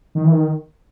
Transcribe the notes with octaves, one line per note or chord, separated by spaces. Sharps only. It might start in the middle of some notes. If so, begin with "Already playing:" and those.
D#3
E3
D#3